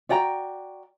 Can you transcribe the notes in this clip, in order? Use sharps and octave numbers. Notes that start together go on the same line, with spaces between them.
F#4 D5 G5 A#5